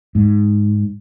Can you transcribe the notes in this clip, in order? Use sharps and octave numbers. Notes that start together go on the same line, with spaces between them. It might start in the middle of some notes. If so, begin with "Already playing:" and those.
G#2